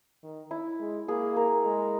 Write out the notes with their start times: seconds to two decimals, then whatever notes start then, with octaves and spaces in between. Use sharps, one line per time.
0.23 D#3
0.51 E4
0.80 G#3
1.08 A#3 G#4
1.36 A#4
1.65 G#3